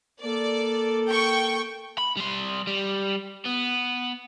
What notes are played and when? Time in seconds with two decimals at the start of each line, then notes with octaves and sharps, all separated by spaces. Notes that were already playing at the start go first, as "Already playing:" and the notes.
0.20 A#3 A4 D5
1.09 G5 C#6
1.98 B5
2.17 G3 C6
2.67 G3
3.45 B3